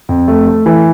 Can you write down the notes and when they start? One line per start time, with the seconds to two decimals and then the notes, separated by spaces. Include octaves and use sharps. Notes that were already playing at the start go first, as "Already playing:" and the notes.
0.09 F2
0.28 A3
0.47 A3
0.66 E3